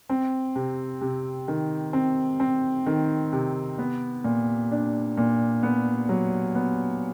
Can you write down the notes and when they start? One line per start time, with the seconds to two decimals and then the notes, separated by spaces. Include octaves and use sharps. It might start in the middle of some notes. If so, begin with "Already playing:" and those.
0.09 C4
0.55 C3
1.01 C3
1.48 D#3
1.93 C4
2.40 C4
2.86 D#3
3.32 C3
3.78 B3
4.24 A#2
4.71 D4
5.17 A#2
5.63 B3
6.09 F#3
6.55 B3